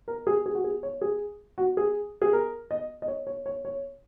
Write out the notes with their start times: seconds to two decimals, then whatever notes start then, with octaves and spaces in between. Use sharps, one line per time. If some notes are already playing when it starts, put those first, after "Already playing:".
0.08 A#4
0.27 G#4
0.46 G#4
0.55 F#4
0.64 G#4
0.83 C#5
1.01 G#4
1.58 F#4
1.77 G#4
2.22 G#4
2.33 A#4
2.71 D#5
3.02 D#5
3.08 C#5
3.27 C#5
3.46 C#5
3.65 C#5